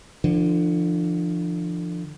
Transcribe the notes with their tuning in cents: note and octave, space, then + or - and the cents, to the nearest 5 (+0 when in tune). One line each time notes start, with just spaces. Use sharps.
D3 +20 F3 -25